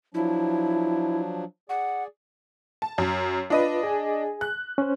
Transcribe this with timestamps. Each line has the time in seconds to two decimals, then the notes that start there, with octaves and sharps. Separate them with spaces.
0.14 F3 F#3 D4 E4
1.69 G#4 D5 F#5
2.82 A5
2.98 F#2
3.50 D4 F4 B4 D#5 D#7
3.83 G#4 G#5
4.41 F#6
4.78 C#4 C5